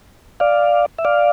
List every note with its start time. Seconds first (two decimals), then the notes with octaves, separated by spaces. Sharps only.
0.40 D5 F5
0.99 E5
1.05 D5 F5